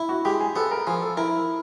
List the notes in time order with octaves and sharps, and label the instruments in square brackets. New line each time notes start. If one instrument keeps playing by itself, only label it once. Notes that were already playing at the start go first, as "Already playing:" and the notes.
Already playing: [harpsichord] E4
[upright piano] F#4
[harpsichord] G#3 [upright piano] G4
[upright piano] G#4
[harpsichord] B3 [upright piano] A4
[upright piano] A#4
[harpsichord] F3 [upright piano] G#4
[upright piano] A4
[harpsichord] E4 [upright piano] A#4